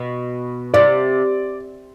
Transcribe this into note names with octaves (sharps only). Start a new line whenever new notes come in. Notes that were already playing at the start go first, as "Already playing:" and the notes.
Already playing: B2
C3 D5